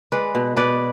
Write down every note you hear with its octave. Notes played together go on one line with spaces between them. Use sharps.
G#3 B4 D5
B2
B2 B4 D5